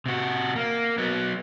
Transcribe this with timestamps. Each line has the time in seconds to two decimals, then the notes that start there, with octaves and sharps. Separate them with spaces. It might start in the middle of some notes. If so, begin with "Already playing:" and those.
0.06 C3 F#4
0.56 A#3
0.98 F#3 B3